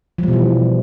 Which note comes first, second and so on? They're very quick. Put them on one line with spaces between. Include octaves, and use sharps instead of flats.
F3 G3 B2 E3